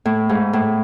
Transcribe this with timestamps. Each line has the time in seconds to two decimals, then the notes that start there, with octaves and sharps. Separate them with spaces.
0.05 A2
0.29 G#2
0.53 A2